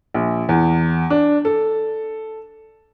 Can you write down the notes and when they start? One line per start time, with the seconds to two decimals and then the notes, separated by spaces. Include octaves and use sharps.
0.14 A#1
0.49 E2
1.10 D4
1.45 A4